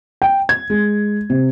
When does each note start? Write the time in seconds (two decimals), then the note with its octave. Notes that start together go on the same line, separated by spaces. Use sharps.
0.22 G5
0.49 G#6
0.70 G#3
1.30 C3